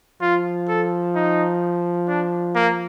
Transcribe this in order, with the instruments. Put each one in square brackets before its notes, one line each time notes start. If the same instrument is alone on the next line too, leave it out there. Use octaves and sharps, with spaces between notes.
[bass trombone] F3 [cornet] F4
[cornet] A4
D#4
D4
A#3